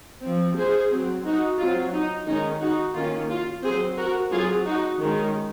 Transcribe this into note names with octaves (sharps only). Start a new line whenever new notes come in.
F3 C4
G#4 C5
F#3 C4
D#4 F#4
F#3 C4 F4
D#4
D#3 G#3 C#4 D#4
D#4 F#4
D#3 A#3 C#4 F4
F4
F#3 C4 G#4 C5
F#4 A#4
F#3 C4 F4 G#4
D#4 F#4
D#3 G#3 C#4